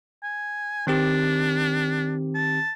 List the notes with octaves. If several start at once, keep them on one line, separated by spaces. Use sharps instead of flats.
G#5
D#3 C4 D4 G4
A5